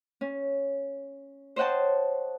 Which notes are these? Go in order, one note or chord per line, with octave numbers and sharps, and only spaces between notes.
C#4
C5 C#5 D#5 F#5 G5 A5